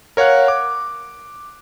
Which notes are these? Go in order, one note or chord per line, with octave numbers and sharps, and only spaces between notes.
A#4 C#5 F5 F#5 F#6
D6